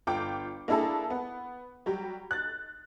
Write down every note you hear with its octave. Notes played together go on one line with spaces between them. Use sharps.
G1 F4 G5 D6
A#3 D4 E4 G#4 A4
B3
F#3 G3 G4
F#6 A6